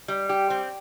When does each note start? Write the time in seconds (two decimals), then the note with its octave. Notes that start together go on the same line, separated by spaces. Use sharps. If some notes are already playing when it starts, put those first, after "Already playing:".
0.08 G3
0.29 G4
0.50 C4